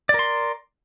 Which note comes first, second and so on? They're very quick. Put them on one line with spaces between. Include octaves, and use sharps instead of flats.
D5 A#4 C6